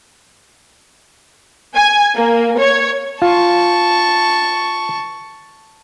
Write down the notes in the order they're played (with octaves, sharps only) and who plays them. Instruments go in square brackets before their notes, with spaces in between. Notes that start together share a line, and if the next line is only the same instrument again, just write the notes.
[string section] G#5
A#3
C#5
[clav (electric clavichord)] F4 [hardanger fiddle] A5 C#6